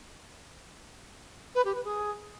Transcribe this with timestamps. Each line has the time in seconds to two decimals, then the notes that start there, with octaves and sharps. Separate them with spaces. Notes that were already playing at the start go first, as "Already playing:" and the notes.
1.55 B4
1.64 G4
1.74 B4
1.84 G#4